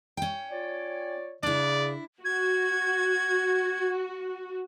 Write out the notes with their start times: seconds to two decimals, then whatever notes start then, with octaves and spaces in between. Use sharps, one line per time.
0.17 C#4 G5
0.50 F4 C#5 D5
1.43 C#3 D4 E4 D5
2.25 F#4 G#6